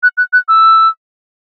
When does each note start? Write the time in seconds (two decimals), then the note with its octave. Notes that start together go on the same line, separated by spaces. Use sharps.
0.03 F#6
0.17 F#6
0.33 F#6
0.48 E6